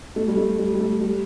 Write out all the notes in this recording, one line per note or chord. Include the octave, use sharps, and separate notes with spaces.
A3
G3
A3
G3
G3
A3
G3